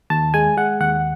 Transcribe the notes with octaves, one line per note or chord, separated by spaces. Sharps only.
D#2 A5
G#3 G#5
G#3 F#5
D#2 F#5